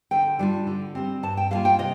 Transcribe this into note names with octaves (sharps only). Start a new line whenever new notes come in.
D3 G5
G3 D4 F4
D3
G3 C4
G2 A5
G5
D3 G3 A#3 F4 F5
G5
C3 D#5